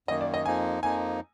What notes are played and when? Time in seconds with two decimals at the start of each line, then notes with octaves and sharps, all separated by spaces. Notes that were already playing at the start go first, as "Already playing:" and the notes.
0.08 F#2 D#3 A#3 D#5
0.21 D5
0.34 D#5
0.45 F2 F3 A#3 D#4 G#5
0.83 F2 F3 A#3 D#4 G#5